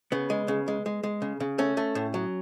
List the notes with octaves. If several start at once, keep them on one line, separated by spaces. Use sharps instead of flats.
C#3 B3
G#3
C#3
G#3
G#3
G#3
C#3
C#3
A3 C#4
A3
A2
F#3